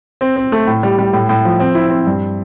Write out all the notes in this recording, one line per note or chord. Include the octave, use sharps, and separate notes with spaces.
C4
C4
A3
A2
G3
G3
A2
A2
F3
C4
E4
C4
G2